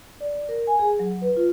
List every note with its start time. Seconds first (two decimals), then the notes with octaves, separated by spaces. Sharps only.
0.21 D5
0.49 A#4
0.67 G#5
0.79 G#4
0.99 F#3
1.22 B4
1.37 F4